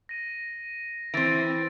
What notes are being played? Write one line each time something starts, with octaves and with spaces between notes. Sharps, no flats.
A#6 D#7
E3 C4 A6 D7